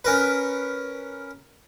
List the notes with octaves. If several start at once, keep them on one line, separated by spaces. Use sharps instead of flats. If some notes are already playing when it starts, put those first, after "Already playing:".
C#4 A#4 B4